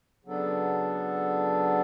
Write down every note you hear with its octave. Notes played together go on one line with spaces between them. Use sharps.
C#3 F#3 B3 D4 A4